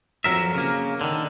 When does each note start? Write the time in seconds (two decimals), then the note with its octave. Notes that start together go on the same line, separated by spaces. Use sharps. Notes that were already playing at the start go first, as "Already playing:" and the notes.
0.24 F2 B2 F#3 A#4 E5
0.55 C#3 A#3
1.01 D3 D#3